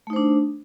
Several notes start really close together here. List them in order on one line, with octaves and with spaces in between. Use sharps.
A3 D#4 C5 D4